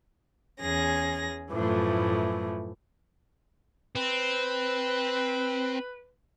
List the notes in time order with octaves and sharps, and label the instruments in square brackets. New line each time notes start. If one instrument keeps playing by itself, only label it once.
[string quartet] E2 C#4 G#4 A#6
F#2 A2 E3 F3 A3
[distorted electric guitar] C4 [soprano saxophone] B4